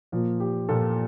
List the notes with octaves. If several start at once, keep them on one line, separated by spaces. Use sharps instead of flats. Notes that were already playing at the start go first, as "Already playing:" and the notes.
A#2 F3 A#3
G4
A#2 F3 A#3 A4